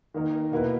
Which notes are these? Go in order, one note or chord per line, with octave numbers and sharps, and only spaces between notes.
D#3 A#3 D#4 A#4
B2 A#3 E4 B4